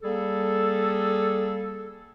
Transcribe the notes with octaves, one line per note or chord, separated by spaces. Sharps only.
G3 A#3 G#4 A4